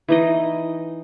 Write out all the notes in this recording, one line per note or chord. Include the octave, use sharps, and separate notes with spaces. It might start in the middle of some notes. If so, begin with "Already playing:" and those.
E3 D#4 D#5